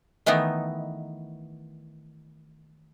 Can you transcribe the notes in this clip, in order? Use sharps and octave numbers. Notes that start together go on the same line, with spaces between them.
D#3 E3 A3 B3 D#4